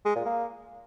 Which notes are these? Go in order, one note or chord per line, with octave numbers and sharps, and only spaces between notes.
G#3
A#2
A#3